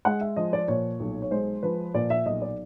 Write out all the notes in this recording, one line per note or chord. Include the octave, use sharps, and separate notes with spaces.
G#3 F#5
E5
F3 D#5
D5
A#2 C#5
B1
C#5
G#3 C5
F3 B4
A#2 D5
E5
B1 D#5
D5